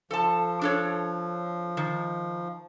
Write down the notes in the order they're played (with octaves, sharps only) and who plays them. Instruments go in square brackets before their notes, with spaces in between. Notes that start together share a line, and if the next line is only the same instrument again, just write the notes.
[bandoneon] F3 [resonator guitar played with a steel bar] A4 A5
[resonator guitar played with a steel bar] D4 A4 C#5
D#3